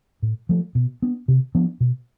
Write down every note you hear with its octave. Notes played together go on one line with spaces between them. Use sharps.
A2
F3 A3
B2
B3 D4
C3
F3 B3 D4
B2